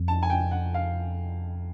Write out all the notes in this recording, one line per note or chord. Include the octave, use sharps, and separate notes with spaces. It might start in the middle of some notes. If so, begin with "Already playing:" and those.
Already playing: F2
A5
G#5
G5
F#5
F5